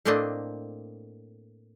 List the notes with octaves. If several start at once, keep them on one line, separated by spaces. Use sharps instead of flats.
A2 A3 A#3 C4 D4 D#5